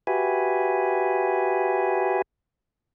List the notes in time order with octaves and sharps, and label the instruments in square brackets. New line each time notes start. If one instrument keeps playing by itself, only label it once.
[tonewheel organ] F#4 G4 B4 E5 G#5